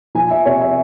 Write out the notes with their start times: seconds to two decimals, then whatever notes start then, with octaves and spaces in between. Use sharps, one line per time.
0.15 F3 G#5
0.31 E5
0.45 C3 C#5
0.61 E5